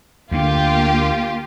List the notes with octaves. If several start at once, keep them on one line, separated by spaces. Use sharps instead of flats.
D2 D3 A#3 F4 G4